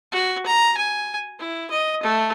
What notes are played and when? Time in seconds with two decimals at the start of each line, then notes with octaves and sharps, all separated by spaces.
0.12 F#4
0.46 A#5
0.77 G#5
1.39 E4
1.70 D#5
2.03 A3